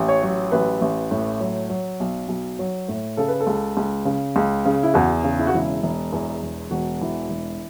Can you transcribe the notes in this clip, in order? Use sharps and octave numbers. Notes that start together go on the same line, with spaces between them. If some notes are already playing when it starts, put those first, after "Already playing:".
Already playing: A1
C#5
F#3
A1 B4
A1
A2
F#3
F#3
B1
B1
F#3
A2
C#3 A4
B4
A4
C#2
C#2
C#3
C#2
C#3
E4
E2 F#4
C#3
E4
F#4
E1 E4
E1
E2
E1
E1 F#4
E3
E1